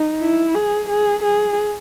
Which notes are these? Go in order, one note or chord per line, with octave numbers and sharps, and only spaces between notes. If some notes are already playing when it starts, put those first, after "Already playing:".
Already playing: D#4
E4
G#4
G#4
G#4